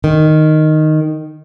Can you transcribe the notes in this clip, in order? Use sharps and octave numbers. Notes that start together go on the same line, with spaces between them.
D#3